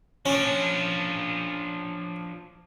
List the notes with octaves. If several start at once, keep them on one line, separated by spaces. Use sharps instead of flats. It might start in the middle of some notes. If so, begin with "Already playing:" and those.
F3 C#4 D4